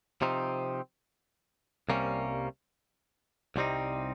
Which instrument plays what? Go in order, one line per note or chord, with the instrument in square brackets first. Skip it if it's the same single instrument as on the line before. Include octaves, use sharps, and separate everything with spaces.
[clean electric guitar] C3 F3 C4 D#4
C2 C3 G3 A#3 C#4
C2 C3 G3 C4 D#4